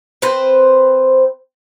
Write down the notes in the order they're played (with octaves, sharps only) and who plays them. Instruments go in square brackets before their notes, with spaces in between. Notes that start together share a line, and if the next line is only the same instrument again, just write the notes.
[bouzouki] C4 B4 C5